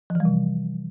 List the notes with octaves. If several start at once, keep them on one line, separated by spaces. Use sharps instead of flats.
F3
E3
G3
C3